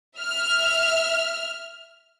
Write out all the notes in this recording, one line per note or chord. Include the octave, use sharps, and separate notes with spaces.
E5 F6